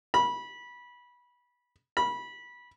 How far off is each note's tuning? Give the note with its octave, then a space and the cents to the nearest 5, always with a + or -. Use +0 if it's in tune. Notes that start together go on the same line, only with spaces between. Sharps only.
B5 -20
B5 -20